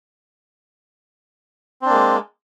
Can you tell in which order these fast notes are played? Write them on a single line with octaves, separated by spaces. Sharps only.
C4 D4 A#3 G#3